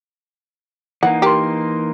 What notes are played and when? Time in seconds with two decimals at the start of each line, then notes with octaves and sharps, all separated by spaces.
1.03 E3 A#3 D#4 F#5
1.22 G4 A#4 C6